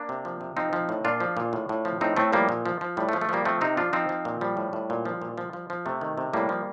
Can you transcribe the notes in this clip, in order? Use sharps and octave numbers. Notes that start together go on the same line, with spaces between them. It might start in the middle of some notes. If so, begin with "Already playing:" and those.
Already playing: A#3 D4
C3
F3
C3
F3 C4 D#4
F3
A2
A#2 D4 F4
F3
A#2
A2
A2
F3
A2 C4 D#4
A2 A3 C4
F3 G3 A#3
A#2
F3
F3
A2 G3
A3
F3
A3
F3 G3 A#3
F3 A3 C4
C3 C4 D#4
F3 D4 F4
F3 C4 D#4
F3
A#2
F3 G3
A2
A2
A#2
F3
A#2
F3
F3
F3
C3 A3
D#3
C3
A2 G3 A#3
F3